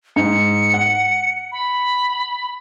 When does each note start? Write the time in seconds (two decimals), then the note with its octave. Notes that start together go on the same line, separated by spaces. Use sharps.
0.16 G#2 C#7
0.74 F#5
1.52 B5